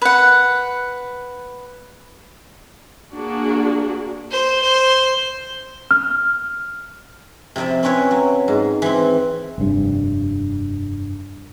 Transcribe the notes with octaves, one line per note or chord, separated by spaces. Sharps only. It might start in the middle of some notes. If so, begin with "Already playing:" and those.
B4 F#5
A#3 D4 F#4 G#4
C5
C5
F6
C3 F3 E4 D5 E5
C4 C#4 E4 B4 C#5
F#3
G#2
E3 C4
F1 G2